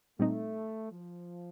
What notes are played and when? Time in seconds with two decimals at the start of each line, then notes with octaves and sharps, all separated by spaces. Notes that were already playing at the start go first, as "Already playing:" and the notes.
0.19 A#2 G3 A3 C4 D#4
0.91 F3